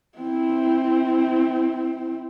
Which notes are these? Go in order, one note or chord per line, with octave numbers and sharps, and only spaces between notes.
C4 E4